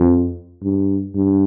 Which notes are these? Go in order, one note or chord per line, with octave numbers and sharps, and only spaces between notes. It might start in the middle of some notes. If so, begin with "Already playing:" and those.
Already playing: F2
G2
G2